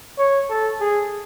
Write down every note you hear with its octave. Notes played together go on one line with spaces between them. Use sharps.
C#5
A4
G#4